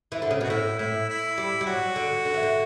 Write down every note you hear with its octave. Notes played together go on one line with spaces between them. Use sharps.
E3
D3
C#3
B2 F#4
A2 E4
A2 E4
E4
G3
G3
F#3 F#4
D3
D3
E3
D3